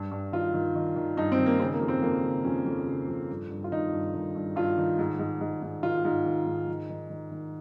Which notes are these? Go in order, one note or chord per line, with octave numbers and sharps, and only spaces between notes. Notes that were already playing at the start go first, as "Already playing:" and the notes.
Already playing: G2
G2
D#3 F4
D#3
D#3
D#3
G2 D#4
C4
D#3
A#3
C#3 C4
A#3
F2
C4
F2 A#3
C#3
F2 C#4
F2
C#3
F2
G2
G2
F4
D#3 D#4
G2
D#3
G2
G2 F4
D#3
G#2
G#2
G#2
G#2
D#3 F4
G#2
D#3
G#2
D#3
D#3
D#3
D#3